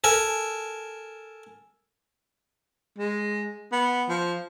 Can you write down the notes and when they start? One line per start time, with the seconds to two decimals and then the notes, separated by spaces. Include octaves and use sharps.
0.04 A4 A#4 G#5
2.98 G#3
3.72 B3
4.09 F3